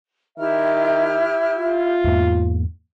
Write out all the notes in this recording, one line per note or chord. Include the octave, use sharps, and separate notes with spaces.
D#3 E4 G4 E5 F6
F4
E2 G#2 A#3